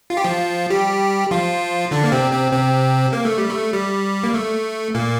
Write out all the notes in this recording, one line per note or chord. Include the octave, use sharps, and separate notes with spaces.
F4
G4
F3 F4
G3 G4
F3 F4
D3 D4
A#3
C3 C4
C3 C4
C3 C4
A#3
A3
G3
A3
G3
A#3
A3
A#2 A#3